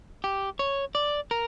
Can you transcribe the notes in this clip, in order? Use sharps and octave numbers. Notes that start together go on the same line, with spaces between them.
G4
C#5
D5
A#4